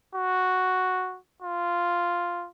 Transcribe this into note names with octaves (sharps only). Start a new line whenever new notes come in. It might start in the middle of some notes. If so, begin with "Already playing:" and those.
F#4
F4